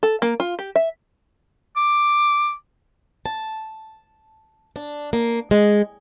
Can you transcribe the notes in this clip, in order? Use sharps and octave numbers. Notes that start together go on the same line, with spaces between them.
A4
A#3
F4
G4
E5
D6
A5
D4
A#3
G#3